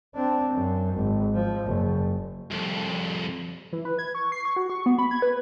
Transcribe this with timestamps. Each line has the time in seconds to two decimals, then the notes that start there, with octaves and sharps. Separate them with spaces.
0.15 C4 D4
0.53 F#2
0.95 G#1
1.34 F3
1.64 F#1
2.51 C2 F2
3.73 E3
3.85 B4
3.99 G#6
4.15 C#6
4.32 C7
4.45 C#6
4.56 F#4
4.70 C#6
4.86 B3
4.99 B5
5.11 G#6
5.22 B4